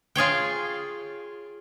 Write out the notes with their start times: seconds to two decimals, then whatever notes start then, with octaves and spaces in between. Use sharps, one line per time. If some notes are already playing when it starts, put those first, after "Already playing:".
0.15 F4 G#4 C#5 G5